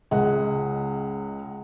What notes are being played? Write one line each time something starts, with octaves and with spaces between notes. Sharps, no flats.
C#2 G#3 F#5